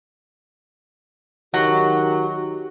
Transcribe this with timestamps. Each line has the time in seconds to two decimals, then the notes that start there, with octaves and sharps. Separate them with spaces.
1.54 D#3 F#3 F#4 G4